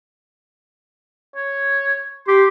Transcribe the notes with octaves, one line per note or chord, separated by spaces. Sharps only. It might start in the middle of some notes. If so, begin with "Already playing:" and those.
C#5
G4 C6